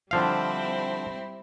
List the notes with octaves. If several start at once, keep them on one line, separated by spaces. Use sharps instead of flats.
D3 F3 G3 C4 E4 F5